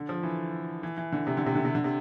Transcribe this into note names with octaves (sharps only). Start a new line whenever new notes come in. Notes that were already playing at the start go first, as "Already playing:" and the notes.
Already playing: D3
F3
E3
E3
E3
D3
C3
D3
C3
D3
C3
D3
C3